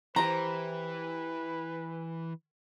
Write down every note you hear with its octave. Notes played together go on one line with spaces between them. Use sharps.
E3 G4 B4 C5 A#5